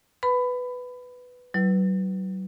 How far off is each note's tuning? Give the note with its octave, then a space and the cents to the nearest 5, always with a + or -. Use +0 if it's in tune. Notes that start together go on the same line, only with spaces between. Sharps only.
B4 +5 B5 +20
F#3 +40 E4 +0 B4 +0